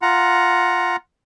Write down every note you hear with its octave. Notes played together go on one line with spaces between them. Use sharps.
F4 F#5 A#5